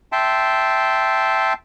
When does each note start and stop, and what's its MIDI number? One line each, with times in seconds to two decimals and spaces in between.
0.12 1.53 76
0.12 1.53 79
0.12 1.53 81
0.12 1.53 84